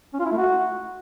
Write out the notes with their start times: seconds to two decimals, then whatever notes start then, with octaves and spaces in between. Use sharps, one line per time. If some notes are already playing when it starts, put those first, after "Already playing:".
0.13 C#4
0.19 F4
0.25 E4
0.31 A3
0.37 F#4